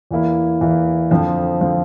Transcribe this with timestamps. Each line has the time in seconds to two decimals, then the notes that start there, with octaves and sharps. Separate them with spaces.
0.11 E2 E3 A#3 E4
0.61 E2 E3 A#3 E4
1.11 F2 D3 F3 C4
1.61 D3 F3 C4